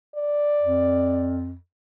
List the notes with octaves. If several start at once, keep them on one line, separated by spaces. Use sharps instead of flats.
D5
F2